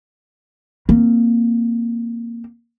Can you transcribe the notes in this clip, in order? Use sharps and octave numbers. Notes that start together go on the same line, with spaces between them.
A#3 C4